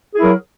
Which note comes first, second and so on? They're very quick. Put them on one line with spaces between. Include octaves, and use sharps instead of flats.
G#4 E4 A#4 F#3